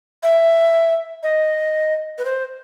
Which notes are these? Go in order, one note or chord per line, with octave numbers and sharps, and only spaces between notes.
E5
D#5
B4
C5